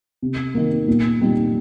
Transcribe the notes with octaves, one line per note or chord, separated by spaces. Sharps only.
C3
D#3 A#3
A#2
G3 C4 D#4